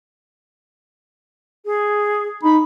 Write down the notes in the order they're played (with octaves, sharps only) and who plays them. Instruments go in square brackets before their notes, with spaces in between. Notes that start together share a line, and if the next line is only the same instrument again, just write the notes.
[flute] G#4
[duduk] D#4 [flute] B5